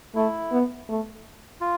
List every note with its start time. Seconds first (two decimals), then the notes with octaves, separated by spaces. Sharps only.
0.15 A3 E4
0.52 B3
0.89 A3
1.61 F4